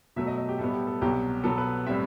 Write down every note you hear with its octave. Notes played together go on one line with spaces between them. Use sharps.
B2 F#3 A3 E5
D#5
D#5
G4
A2 G3 B3 A4
G4
A4
C2 B2 F#3 G4
B2 F#3 B3 A4
B4
A2 G3 C4 E5